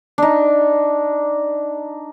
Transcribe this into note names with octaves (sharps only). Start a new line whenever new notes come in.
D4 D#4